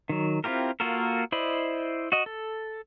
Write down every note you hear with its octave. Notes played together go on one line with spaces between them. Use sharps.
D#3 F#3
C4 E4 F4 G4 A#4
A#3 F4 F#4 A4 A#4
E4 C5 D5 D#5 B5
F#4 D#5
A4